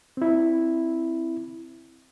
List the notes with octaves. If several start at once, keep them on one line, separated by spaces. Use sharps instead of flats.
C4 E4